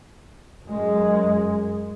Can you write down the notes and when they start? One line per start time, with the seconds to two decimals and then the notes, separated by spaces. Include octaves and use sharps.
0.64 F#2 G#3